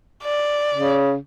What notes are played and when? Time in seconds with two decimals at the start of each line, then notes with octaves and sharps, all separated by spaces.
0.23 D5
0.74 C#3